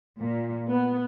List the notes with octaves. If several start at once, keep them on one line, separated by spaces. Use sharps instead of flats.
A#2
B3